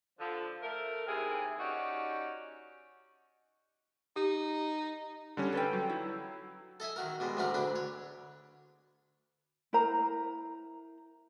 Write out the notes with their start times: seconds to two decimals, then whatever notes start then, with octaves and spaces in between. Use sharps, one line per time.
0.20 D3 F3
0.62 A3 A#4
1.07 D#2 C3 E4 G#4
1.59 C#4 D#4 F#4 G4 D5
4.16 D#4 G4
5.37 D3 G3 C#4
5.53 A4 B4 G5
5.73 F#3
5.89 E4
6.80 A4 D#5 E5 G#5
6.96 D#3 F#4 A#4
7.20 B2 G3 G#3
7.37 D2 A2 F#3 C#4 F#4 A#4
7.54 D2 D3 D4 B4
7.76 C#5
9.73 E4 A#4 C5 A#5